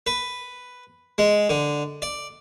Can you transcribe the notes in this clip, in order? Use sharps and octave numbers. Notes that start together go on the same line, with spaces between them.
B4
G#3
D3
D5